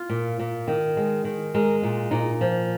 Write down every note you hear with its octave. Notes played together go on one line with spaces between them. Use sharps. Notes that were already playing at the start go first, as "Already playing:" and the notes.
Already playing: F4
A#2
A#2
D#3
G#3
D#3
G#3 A#4
A#2 F4
A#2 D#4
F3